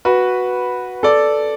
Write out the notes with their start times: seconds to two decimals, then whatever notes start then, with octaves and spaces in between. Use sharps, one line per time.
0.05 F#4 B4
1.03 A4 D5